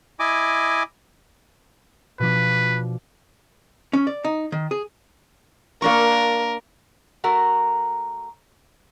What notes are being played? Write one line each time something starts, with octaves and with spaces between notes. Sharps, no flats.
E4 D#5 G#5 D6
B2 F3 D4 B4
C#4
D5
D#4
D#3
G#4
A#3 D4 A#4 C#6
A3 F#4 A#4